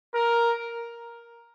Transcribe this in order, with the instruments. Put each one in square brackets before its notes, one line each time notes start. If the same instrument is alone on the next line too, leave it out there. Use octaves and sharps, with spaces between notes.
[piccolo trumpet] A#4